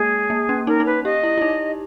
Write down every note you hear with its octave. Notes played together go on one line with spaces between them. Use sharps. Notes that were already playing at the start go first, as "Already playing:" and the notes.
Already playing: G#3 A#3 G#4
A#3
C#4
D#4 A#4
D#4
B4
G4 D#5
E4
E4
D#4